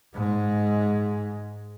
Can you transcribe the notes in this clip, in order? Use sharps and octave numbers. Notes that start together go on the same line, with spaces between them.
G#2 G#3